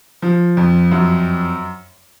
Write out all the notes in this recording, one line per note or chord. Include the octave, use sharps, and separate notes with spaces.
F3
F2
F#2